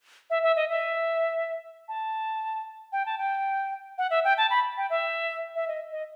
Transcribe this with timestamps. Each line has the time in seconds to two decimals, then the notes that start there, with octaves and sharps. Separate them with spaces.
0.30 E5
0.43 E5
0.56 D#5
0.70 E5
1.88 A5
2.93 G5
3.06 A5
3.18 G5
3.98 F#5
4.10 E5
4.24 G5
4.38 A5
4.50 B5
4.77 G5
4.90 E5
5.55 E5
5.68 D#5
5.91 D#5